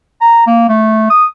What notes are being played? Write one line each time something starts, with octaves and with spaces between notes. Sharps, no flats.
A#5
A#3
A3
D#6